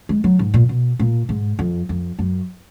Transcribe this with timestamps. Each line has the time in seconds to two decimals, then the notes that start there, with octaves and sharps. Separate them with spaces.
0.09 G#3
0.24 F#3
0.39 G#2
0.54 A#2
0.69 B2
0.99 A#2
1.29 G#2
1.59 F2
1.89 F2
2.19 F#2